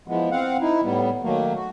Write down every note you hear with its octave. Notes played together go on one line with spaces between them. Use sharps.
E3 F3 G#3 B3
C4 F5 F#5
D#4 E4
A2 G3 B3
D#3 F#3 A3 A#3
F#4